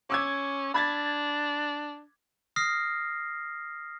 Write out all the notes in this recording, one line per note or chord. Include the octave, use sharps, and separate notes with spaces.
C#4 D6 E6 G#6
D4 B5 G#6 A6
D#6 F6 A#6 C7